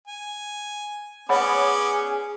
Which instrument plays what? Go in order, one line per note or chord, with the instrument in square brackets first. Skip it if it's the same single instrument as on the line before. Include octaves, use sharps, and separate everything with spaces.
[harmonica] G#5
[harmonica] B3 C#4 D5 [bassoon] G#4 [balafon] C#5 F#5 B5